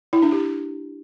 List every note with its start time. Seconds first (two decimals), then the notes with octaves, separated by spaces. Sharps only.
0.13 E4
0.22 D4
0.32 G4